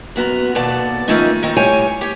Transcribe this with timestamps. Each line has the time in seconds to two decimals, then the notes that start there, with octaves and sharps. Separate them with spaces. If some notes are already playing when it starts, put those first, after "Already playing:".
0.16 F#2 B3 F#4 A#5
0.55 D#2 B2 B3 A4 D5 A5
1.08 D#3 F3 A3 A#3 C#4 D#4
1.43 D#3 C4 D#4
1.57 A2 G3 A3 C#5 G5 G#5
2.01 G4 C#5